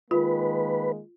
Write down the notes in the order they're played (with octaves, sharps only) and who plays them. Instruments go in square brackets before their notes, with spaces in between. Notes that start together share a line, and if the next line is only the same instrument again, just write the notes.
[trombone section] D#3 G#3 A#3 [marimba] F4 [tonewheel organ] B4